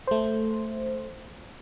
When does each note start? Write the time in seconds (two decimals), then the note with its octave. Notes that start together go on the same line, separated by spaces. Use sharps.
0.07 A3 C5